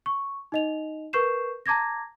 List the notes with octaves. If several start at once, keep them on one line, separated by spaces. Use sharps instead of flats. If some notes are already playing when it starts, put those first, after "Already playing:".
C#6
D#4 D#5 F7
A#4 B4 C#6 G6 C7 E7
A5 A#5 D6 G#6 A#6